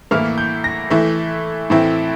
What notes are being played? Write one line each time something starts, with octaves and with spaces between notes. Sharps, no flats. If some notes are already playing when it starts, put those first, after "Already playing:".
A2 E3 A#3 E4 F6
G6
A#6
E3 A3 E4
A2 E3 A3 C4 E4